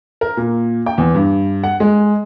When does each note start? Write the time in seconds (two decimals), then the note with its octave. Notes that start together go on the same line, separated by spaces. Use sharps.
0.21 A#4
0.37 A#2
0.86 G5
0.98 E2
1.15 G2
1.64 F#5
1.80 G#3